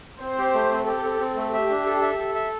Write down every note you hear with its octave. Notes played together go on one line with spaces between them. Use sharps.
C4 C5
G4
A3
C4
G4 A4
C4
C4
A3
G4 E5
D4
A4
E5
A4
E5